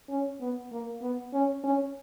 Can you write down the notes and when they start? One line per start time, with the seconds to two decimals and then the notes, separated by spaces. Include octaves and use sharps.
0.09 C#4
0.41 B3
0.72 A#3
1.02 B3
1.33 C#4
1.64 C#4